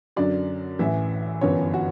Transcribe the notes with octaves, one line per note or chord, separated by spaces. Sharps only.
F#2 D3 F#3 D5
A1 A2 E3 E5
G1 F#2 E3 B3 C#5
F#4